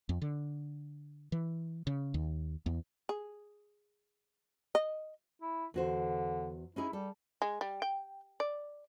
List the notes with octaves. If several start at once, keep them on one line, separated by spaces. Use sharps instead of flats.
F2
D3
E3
C#3
D#2
E2
G#4
D#5
E4
E2 D3 F#4 C5
C#4 D#4 E4 G#4
G3 A4
G#3
G3
G5
D5